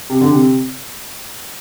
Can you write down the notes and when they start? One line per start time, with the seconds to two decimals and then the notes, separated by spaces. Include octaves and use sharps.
0.10 C3
0.21 D3
0.31 C3